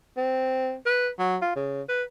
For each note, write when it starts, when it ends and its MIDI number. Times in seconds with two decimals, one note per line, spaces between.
0.17 0.75 60
0.86 1.09 71
1.19 1.37 54
1.42 1.51 65
1.56 1.82 49
1.89 2.03 71